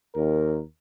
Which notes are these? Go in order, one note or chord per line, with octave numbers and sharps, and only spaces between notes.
D#2 A#4